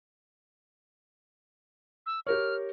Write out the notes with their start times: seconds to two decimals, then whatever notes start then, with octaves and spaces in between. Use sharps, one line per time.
2.06 E6
2.27 G4 A#4 C#5 F6